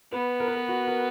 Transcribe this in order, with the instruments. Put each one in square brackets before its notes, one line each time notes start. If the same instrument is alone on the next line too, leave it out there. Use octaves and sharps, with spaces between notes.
[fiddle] B3 [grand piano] B4
[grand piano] A#4
B4
A#4
F#4
A#4